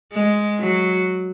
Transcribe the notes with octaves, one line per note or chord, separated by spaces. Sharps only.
G#3
F#3